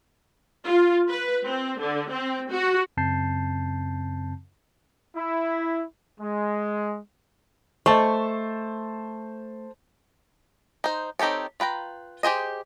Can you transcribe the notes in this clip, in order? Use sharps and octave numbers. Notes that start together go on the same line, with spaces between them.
F4
B4
C4
D3
C4
F#4
F#2 C#3 C4 A5 G6 C7
E4
G#3
A3 C5 D#5 A5 C#6
D#4 C5
C4 D#4 G4 A4 C#5
F4 B4 G5 A#5
G4 G#4 C5 D#5